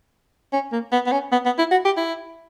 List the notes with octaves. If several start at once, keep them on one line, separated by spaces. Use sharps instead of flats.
C#4
A#3
B3
B3
C#4
B3
B3
E4
F#4
G4
E4